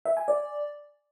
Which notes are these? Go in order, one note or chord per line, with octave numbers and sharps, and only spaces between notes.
E5
G#5
D5